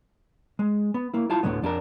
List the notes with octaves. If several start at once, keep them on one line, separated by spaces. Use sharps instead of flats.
G#3
B3
A#3 E4
E4 F4 A5
D2 A2 D3 D#3 G#3 B3
F2 D4 G#4 A#4